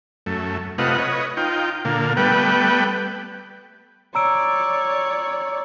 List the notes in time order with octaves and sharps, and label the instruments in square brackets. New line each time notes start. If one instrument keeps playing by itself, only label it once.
[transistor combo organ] F#2 A3
C3 A3 F4 B4 D#5 F#5
B4 C#5 D#5
D#4 F4 G5
A#2 D3 A#3
G3 A3 B3 B4 G5
[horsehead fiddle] C#5 D5 [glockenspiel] A#5 E6 D7